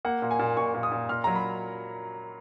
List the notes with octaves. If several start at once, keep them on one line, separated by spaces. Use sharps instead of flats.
A#3 F#5
A#2
G#5
A#2
A#2 C#6
A#2
D#6
A#2
A#2 F6
F#3 A#5
B5